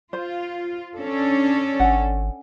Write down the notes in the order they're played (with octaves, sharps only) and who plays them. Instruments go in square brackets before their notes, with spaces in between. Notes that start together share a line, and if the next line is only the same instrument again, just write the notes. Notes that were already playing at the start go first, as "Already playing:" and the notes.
[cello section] F4 [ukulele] C5
[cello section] C#4 D4 A4
[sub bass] G#1 [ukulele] F#5 G#5